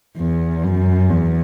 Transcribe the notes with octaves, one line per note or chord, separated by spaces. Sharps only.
E2
F#2
E2